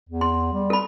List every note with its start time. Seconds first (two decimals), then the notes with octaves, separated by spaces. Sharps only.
0.09 E2
0.21 C6
0.53 G3
0.70 A4 B5